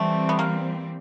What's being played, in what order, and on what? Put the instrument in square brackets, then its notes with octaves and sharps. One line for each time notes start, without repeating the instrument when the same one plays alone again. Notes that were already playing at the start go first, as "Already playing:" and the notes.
Already playing: [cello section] E3 G3 C4 [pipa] A3
[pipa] B3
A#3